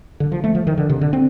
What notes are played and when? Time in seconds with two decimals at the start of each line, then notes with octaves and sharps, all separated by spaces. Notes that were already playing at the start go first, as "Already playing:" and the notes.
0.20 D3
0.32 F3
0.44 A3
0.55 F3
0.67 D#3
0.78 D3
0.89 C3
1.01 D3
1.13 C4